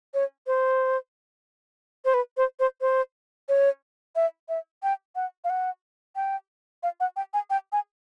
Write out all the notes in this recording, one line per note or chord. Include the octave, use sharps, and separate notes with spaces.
C#5
C5
C5
B4
C5
C5
C5
C#5
E5
E5
G5
F#5
F5
F#5
G5
F5
F#5
G5
G#5
G5
G#5